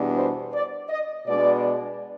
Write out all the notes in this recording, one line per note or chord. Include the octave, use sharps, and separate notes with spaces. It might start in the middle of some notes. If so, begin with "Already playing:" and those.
Already playing: E2 B2 G3 B3 D4
C5
D5
D#5
B2 G#3 B3 D4 D5